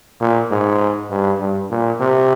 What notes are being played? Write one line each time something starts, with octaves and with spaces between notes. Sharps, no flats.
A#2
G#2
G2
G2
A#2
C3